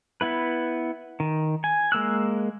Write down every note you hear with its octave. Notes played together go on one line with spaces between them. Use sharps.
B3 E4 B4
D#3
G#5
G#3 A#3 E6 F#6